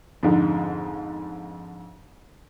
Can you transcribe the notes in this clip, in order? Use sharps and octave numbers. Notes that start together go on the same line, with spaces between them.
F2 G#2 D3